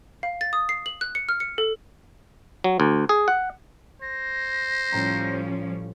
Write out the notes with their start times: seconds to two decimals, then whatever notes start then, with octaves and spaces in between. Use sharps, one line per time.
0.23 F5
0.41 A6
0.53 D#6
0.69 C7
0.86 F#7
1.01 F#6
1.15 C#7
1.29 F6
1.40 C#7
1.58 A4
2.64 F#3
2.80 D2
3.09 G#4
3.28 F#5
4.02 C5 A#6
4.92 A2 F3 G3 C#4 A#5